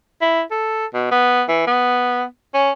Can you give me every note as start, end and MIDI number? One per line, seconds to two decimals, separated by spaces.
0.21 0.42 64
0.51 0.86 69
0.94 1.08 47
1.11 1.43 59
1.48 1.66 52
1.67 2.25 59
2.54 2.71 61